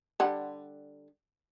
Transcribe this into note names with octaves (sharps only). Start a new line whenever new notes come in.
D3 G3 F#5